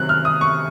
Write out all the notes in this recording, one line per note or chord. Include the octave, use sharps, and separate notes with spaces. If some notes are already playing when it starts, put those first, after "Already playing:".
Already playing: C3 D#3 F#3 C4 F#6
F6
D#6
C#6